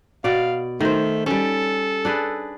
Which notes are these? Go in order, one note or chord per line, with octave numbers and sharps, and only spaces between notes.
B2 D5 F5
D#3 A3 C5
G3 C#4 A4
D4 G#4 B4